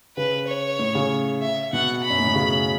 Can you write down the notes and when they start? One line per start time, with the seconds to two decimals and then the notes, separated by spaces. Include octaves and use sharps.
0.17 C#3 B4
0.48 C#5
0.79 A2
0.95 C#3
1.42 E5
1.73 B2 F#5
2.04 B5
2.10 F#2
2.19 A2
2.27 B2
2.35 C#3